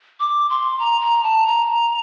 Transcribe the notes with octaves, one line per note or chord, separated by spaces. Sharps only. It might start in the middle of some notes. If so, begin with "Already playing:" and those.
D6
C6
A#5
A#5
A5
A#5